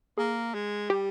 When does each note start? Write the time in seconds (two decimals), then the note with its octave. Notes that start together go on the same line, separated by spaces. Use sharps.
0.18 A#3 G#4
0.55 G#3
0.90 G3 G4